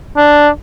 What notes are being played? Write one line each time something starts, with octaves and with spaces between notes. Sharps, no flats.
D4